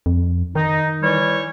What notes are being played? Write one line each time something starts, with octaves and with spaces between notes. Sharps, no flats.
F2
D#3 D#4
E3 G3 C#5